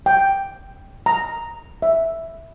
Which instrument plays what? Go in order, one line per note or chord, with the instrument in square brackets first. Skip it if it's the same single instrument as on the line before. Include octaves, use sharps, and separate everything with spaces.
[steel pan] G5
A#5
E5